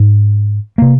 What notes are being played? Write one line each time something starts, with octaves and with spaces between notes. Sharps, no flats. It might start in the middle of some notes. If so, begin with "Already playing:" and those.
Already playing: G#2
C3 A#3